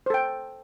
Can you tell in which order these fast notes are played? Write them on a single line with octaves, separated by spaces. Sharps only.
C5 A4 G5